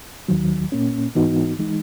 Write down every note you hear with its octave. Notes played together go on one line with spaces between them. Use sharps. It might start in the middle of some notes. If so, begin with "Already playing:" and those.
D#2 D#3 F#3
A#2 A#3 C#4
G#2 E3 B3 D#4 F#4
E3 G#3 D#4